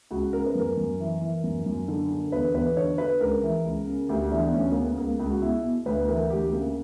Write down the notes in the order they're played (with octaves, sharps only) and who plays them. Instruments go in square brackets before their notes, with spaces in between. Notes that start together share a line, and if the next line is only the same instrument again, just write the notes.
[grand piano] C#2 F#4
C#3 A#4
B4
F#2 A#4
F#2
E3
E3
F#2
F#2
D3
D3
E2 B4
E2 B4
D3 C#5
D3 B4
C#2 A#4
E3
C#2
C#3
D2 G4
E3 D4
B3
D2 C#4
A#3
C#3 B3
C#2 A#3
C#2
F#4
B2 E4
B2
D2 B4
E3 A#4
D2 G4
C#3 A#3